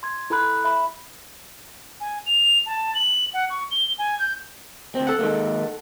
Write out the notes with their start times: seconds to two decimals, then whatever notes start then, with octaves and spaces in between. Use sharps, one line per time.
0.03 C6 G#6
0.30 E4 A4 A#5 B5 F#6
0.64 E5 B5
2.01 G#5
2.26 F7
2.66 A5
2.95 F#7
3.34 F#5
3.50 C#6
3.71 G7
3.98 G#5
4.19 G6
4.95 D2 C4
5.07 A4 F#5
5.19 D#3 G#3 A#3